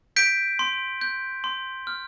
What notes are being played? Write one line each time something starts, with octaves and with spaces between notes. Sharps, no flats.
G6 B6 D7
C6
G6
C6
F6